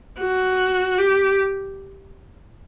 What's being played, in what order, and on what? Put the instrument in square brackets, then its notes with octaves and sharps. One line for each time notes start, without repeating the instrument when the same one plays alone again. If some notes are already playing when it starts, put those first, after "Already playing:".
[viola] F#4
G4